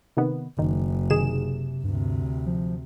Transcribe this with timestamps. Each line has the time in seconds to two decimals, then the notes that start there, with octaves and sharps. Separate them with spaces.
0.17 C3 D#3 B3
0.59 F#1 D#3
1.10 C3 D#3 G#4 E7
1.84 D2 G2 C3
2.46 F3